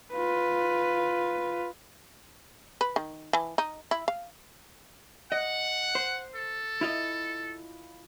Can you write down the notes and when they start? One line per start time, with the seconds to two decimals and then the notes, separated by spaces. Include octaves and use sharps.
0.12 F4 B4
2.81 B4
2.96 D#3
3.33 E3
3.58 D#4
3.91 E4
4.08 F5
5.32 D#5 F#5
5.95 C5
6.36 A4
6.81 E4 F4 D#5